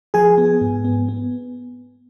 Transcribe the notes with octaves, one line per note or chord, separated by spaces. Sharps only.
F3 G#4 G#5
B3
G#2
B3
B3